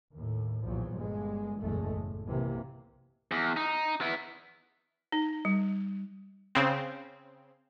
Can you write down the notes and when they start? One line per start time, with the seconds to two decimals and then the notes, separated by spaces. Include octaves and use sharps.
0.14 D#2 A2
0.63 B1 E2 A#2 F3 F#3
0.94 G1 G2 G#3
1.60 F#1 B1 E2 A#2 G#3 A3
1.88 A2
2.26 B1 C3 E3 A#3
3.31 E2
3.57 D#4
4.01 B3 E4
5.12 D#4
5.45 G3
6.55 C#3 C4